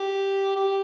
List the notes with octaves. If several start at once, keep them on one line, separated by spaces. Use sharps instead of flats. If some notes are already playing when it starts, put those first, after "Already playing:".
Already playing: G4
G4